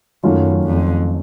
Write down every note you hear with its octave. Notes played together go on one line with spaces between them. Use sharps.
F#2 D#3 F#3 A3 C#4 F4
F2